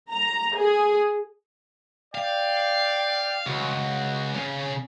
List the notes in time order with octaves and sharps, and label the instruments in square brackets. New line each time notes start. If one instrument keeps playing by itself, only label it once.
[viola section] A#5
G#4
[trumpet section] D5 G5 [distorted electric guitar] F5
[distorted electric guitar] C#2 [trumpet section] F#4
[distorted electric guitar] C#3 C#4